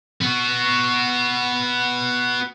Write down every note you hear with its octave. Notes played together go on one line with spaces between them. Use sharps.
B3 F#4